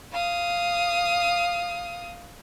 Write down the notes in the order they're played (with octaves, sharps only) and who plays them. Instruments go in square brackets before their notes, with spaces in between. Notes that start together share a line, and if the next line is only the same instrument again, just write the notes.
[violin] F5 D#6